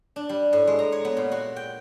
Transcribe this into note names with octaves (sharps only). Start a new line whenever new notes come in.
D4
G3
A2
G#3
A#5
C#5
B3
A#2
F#4
G5